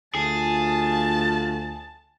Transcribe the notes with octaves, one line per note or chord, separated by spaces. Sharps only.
D2 F4 G#4 A5